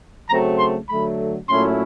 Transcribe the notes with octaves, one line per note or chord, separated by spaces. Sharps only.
C#3 F#3 A3 C4 A#5
C6
D3 F#3 A3 B5
A#2 F#3 A3 C#4 E4 C6